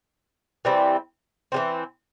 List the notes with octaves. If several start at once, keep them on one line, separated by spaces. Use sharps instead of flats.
E3 G3 C4
E3 G3 C4